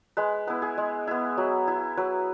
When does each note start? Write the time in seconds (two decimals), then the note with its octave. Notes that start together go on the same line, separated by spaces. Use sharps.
0.17 G#3 B4
0.47 B3 E4 B4
0.62 G#4
0.78 G#3
1.07 B3 E4
1.37 F#3
1.68 E4
1.97 F#3 B4